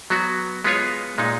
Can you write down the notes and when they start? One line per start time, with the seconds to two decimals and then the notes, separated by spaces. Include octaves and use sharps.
0.10 F#3 B3 F#4
0.64 G#3 B3 F4 G#4 C#5
1.18 A#2 G#3 D#4